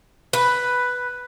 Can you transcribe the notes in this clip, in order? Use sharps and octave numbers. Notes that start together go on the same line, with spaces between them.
B4